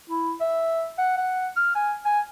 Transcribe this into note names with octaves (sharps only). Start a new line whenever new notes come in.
E4
E5
F#5
F#5
F6
G#5
G#5